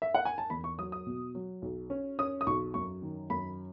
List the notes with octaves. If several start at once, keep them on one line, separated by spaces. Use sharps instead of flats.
E5
F#5
G#5
A5
E2 B5
C#6
F#3 D#6
D#6
B2
F#3
B1
C#4
C#4 D#6
D#6
B1 C#6
F#2 C#6
D#3
F#2 B5